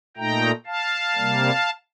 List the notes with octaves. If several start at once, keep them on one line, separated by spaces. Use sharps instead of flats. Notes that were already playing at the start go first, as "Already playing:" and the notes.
A#2 A3 D#4 G5 A#5
F5 A5
C3 G3 A#3